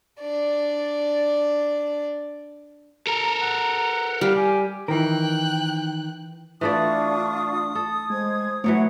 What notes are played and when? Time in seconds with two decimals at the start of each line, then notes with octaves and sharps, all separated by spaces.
0.21 D4 D5
3.07 A4 A#4 A#5
3.41 F#5
4.21 G3 F5
4.35 G4 G#5
4.88 D#3 E3 A#4 G5 F#6
6.61 E3 A3 D4 F4 D5 C#6 D#6
7.75 A4
8.10 G#3 C5 G#6
8.64 E3 F#3 A3 C#5 F#5